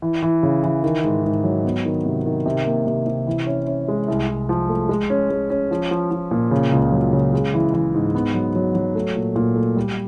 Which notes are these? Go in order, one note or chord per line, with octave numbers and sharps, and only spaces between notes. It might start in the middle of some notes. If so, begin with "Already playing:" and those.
E3
E3
C#3
E3
D#3
G#2
G#2
F#3
B3
D#3
C3
D#3
C3
A#3
C3
C3
E3
C#4
C#4
G#3
C2
C2
F3
A3
G#3
C#4
G#3
C#4
F3
F3
F3
A#2
C#3
C#2
F#3
C#3
G#3
E3
E3
G#2
B3
F#3
F#3
F#3
A3
A#2
A#2
A3
G3